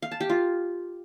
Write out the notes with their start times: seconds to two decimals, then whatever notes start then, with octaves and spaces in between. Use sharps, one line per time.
0.02 F5
0.11 A5
0.21 G4
0.30 F4